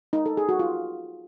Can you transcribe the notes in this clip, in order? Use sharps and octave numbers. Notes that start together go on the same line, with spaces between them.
D#4
A4
G#4
F#4
F4